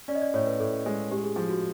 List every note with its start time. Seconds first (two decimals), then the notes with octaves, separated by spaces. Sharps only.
0.08 C#4 D5
0.15 D#5
0.22 D5
0.34 A2 C#5
0.47 B4
0.60 A2 A4
0.86 G#3 G#4
1.11 G#3 G4
1.24 G#4
1.36 F3 G#4
1.49 F#4